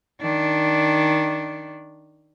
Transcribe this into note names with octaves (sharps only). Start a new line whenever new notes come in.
D#3 D4